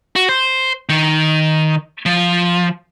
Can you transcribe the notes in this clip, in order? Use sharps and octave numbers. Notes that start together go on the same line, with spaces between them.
F#4
C5
D#3
F3